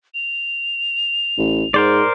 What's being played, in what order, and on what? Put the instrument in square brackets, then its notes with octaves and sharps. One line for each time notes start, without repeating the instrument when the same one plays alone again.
[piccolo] F7
[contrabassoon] A1
[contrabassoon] G#2 [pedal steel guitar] A#4 C5 D5